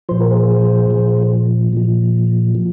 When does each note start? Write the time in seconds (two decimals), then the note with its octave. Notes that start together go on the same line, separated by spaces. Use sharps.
0.09 A#2 F3 C5
0.20 A#4
0.31 G#4 C5
0.91 A#2 F3
1.73 A#2 F3
2.55 F3